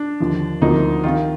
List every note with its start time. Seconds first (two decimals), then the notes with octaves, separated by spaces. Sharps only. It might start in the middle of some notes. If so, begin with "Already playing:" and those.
Already playing: D4
0.20 D#2 D3 F3
0.61 D2 C3 F3 A#3 D#4
1.04 C2 C3 D#3 F4